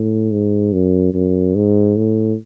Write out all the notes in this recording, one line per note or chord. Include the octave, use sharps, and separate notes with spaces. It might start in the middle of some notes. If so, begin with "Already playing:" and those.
Already playing: A2
G#2
F#2
F#2
G#2
A2